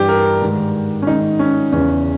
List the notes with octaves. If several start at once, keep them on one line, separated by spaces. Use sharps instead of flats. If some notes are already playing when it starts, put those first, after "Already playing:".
Already playing: G2 E3 G4
A#4
G#2 D#3
C#4
G#2 D#3 D#4
C#4
E2 C#3 E3 C#4